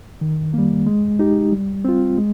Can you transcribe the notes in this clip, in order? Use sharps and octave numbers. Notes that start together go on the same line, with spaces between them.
D#3
G3 A#3
G#3
D#4 G4
G3
C4 F4
G#3